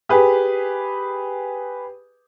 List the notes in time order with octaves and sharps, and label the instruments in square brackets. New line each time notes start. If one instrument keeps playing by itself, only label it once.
[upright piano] G4 G#4 B4